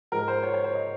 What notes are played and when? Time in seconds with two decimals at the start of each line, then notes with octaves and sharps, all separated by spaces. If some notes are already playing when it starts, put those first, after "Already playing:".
0.12 G#2 F3 G#3 A#4
0.28 C5
0.43 C#5
0.54 C#5
0.64 C5
0.75 D#5